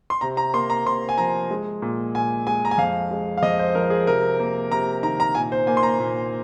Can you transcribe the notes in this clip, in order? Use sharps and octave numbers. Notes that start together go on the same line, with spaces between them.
C6
C3 A#5
A#5
A#3 C6
A#5
C3 C6
G#5
F3 A#5
G#3
A#2
A#2 G#5
G#3 G#5
A#5
G#5
F2 F5
G#3
F5
F2 D#5
C5
F3 A#4
G#4
C3 A#4
A#3
C3 A#5
D#3 A#5
A#5
A#2 G#5
C5
A#3 G#5
C6
A#5
A#2